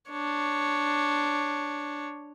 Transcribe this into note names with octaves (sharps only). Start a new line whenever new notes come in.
D4 C#5